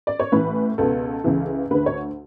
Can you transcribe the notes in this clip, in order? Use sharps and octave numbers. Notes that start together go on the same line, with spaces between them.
D5
C#5
A1 A2 E3 B4
C#2 B2 A4
C#2 C#3 E3
D2 D3 B4
C#5